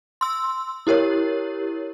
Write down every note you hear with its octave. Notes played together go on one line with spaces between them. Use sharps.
C6 E6
E4 G4 A#4 C#5